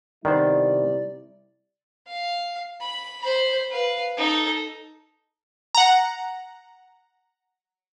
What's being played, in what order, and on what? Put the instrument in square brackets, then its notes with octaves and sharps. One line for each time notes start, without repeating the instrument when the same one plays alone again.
[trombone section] C3 G3 E4 [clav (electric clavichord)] D#3 B3 C5 [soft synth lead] D5
[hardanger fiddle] F5
B5
C5 B5
B4 F5
D#4 A4
[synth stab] F#5 A#5